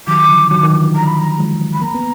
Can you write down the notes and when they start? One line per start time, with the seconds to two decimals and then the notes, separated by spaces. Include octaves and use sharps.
0.07 D#3 F#3 D6
0.29 D3 F3
0.51 D#3 F#3
0.63 D#3
0.72 D3 F3
0.94 A#5
1.06 B5
1.18 A#5
1.38 F3 G#3
1.73 B5
1.82 A#3 A#5
1.95 B3